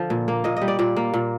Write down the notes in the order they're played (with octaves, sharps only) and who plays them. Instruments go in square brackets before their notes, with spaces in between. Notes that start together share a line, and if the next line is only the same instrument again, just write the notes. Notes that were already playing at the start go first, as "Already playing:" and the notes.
Already playing: [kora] D3 F3
A#2
A#3
A#2 D#5
G3 D#5
D5
A#2 D5
A#3
A#2